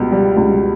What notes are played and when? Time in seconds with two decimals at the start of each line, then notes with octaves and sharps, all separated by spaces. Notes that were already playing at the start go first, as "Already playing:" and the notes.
Already playing: C#2 B2 G3
0.12 G3
0.37 C#2